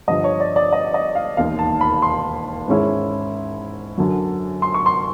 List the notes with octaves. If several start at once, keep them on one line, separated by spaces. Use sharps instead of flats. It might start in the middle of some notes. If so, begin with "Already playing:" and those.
G2 D3 F3 D#5
C#5
D5
D5
D#5
D#5
F5
E1 D#2 D#3 F5
A5
B5
C6
G#2 D#3 G#3 C#4 E4
F#2 D3 F#3
C6
C#6
C6